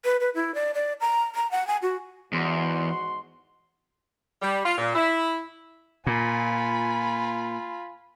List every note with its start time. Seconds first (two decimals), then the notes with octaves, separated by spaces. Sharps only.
0.05 B4
0.20 B4
0.35 E4
0.55 D5
0.74 D5
1.01 A#5
1.35 A#5
1.51 F#5
1.67 G#5
1.82 F#4
2.33 E2 G#2 F#4 C6
4.42 G3
4.65 F4
4.78 A#2
4.95 E4
6.07 A#2 F4 G#5 B5